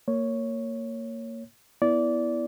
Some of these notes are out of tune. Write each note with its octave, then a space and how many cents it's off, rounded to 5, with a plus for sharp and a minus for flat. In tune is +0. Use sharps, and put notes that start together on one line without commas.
A#3 -20 C#5 +0
B3 +0 E4 +0 D5 -20